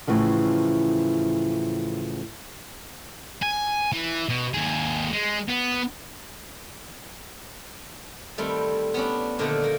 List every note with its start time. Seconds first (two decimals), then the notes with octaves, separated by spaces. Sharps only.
0.08 A2 C#3 E3 F3
3.43 G#5
3.93 E3
4.29 B2
4.54 D#2 G#4
5.13 G#3
5.48 B3
8.38 D#3 G3 A3 C4 E4
8.94 B3 C#4 D4
9.39 A#2 D3 D#3 F3 A3 D#4
9.62 A3 A#3